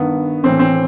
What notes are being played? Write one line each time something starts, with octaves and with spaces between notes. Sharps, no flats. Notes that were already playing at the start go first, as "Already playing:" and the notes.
Already playing: G2 D#3 B3
A2 E3 C4
C4